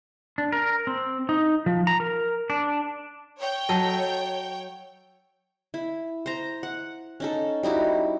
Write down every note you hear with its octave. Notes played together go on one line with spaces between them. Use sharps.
D4
A#4
C4
D#4
F3
A#5
A#4
D4
C#5 G5
F#3 A4 D#5
E4
C5 A#5
F#5
C#4 D#4 A4
G3 D#4 E4 F#4